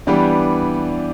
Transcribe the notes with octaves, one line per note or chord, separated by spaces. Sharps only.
E3 G3 B3 D4 G4